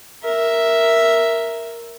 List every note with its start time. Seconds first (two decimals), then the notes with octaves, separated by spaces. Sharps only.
0.24 A#4 E5